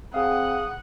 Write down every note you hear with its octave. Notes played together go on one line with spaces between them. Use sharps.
C4 G#4 F5 F#5 D#6